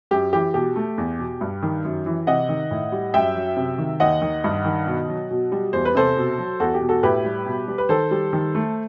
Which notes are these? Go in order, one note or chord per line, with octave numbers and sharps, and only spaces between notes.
F#2 G4
E3 G4
B2 G4
A3
E2
B2
G2
D#3
F#2
E3
C3 D#5 F#5
D#3
A2
G3
F#2 E5 G5
F#3
C3
D#3
D#2 D#5 F#5
D#3
G2
D#3
B2
F#3
B2
G3
E2 C5
B4
C3 A4 C5
B2
F#3
E2 F#4 A4
G4
B2
F#4 A4
A2 G4 B4
G3
B2
G3
B4
D#3 A4 C5
G3
D#3
A3